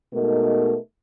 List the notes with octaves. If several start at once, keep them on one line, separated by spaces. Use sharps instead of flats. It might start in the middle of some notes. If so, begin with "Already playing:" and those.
B2 G#3 A3 D#4 A#4